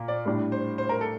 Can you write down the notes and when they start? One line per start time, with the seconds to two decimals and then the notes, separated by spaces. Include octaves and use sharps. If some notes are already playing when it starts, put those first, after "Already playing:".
Already playing: A#2
0.08 D5
0.26 A2 G3 D4
0.52 C5
0.78 C5
0.89 A#4
1.01 A4